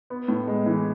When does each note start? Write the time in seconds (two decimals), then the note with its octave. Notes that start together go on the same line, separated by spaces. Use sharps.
0.10 B3
0.28 A2
0.48 G#3
0.66 E3